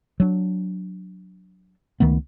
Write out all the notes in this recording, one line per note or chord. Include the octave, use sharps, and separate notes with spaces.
F#3 D4
C#2 D#3 A3 B3